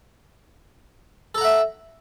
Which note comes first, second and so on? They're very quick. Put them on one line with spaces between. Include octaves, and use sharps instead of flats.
A4 A#5 F#5 E5